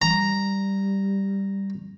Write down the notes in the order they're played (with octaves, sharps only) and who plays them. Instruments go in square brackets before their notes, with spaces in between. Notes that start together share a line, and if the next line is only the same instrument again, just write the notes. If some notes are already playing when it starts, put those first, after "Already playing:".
[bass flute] G3 [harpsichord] A#5